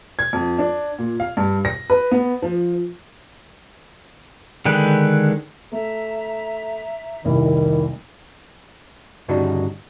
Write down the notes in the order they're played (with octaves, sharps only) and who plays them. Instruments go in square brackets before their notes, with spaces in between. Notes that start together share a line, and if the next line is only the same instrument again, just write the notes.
[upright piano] G#6
F2
D4
A#2
F5
G2
A#6
B4
B3
F3
[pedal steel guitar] D3 D#3 G#3 B4 G5
[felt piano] A3 [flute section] E5 A#5
[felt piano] F1 C2 E4 [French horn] D#3
[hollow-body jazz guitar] D2 G2 C#3 D4 D#4 F#4